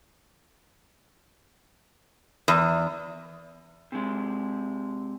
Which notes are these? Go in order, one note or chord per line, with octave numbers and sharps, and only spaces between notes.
E2
C3 G#3